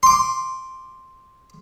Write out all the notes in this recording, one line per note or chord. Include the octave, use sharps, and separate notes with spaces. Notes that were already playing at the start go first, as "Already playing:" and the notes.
C6 D6